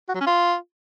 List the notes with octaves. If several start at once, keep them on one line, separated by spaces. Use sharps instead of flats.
F#4
F#3
C#4
F4